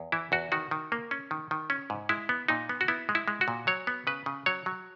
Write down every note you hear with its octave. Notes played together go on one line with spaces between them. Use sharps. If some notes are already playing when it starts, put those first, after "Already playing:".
Already playing: E2
E3 E4
E2 F#4
D#3 F#4
D#3
A#3
C#4
D#3
D#3
C#4
G#2
G#3 E4
B3
A#2 D#4
B3
F#4
B3 E4
G#3
E4
G#3
F#4
A#2
F#3 C#5
B3
C#3 B4
C#3
F#3 C#5
F#3